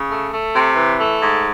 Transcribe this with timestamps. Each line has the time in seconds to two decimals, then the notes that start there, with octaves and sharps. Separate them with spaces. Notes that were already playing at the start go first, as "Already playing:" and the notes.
Already playing: C#3
0.10 A3
0.31 A3
0.53 C3
0.76 E3
0.98 A3
1.20 G#2